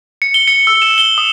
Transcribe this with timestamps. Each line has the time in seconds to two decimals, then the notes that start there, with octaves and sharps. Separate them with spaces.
0.22 C#7
0.34 G7
0.48 C#7
0.67 E6
0.82 E7
0.98 G7
1.18 D#6